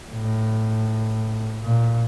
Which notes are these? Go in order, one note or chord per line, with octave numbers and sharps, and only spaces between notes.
A2
A#2